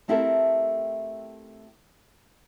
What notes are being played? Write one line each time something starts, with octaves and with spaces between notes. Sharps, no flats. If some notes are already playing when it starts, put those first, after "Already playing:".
A3 C4 E4 G4 A4 A#4